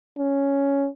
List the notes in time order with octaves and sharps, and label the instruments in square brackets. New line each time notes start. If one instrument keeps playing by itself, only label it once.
[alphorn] C#4